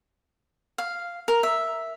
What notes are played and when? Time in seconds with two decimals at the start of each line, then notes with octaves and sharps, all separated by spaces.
0.78 F5
1.28 A#4
1.43 E5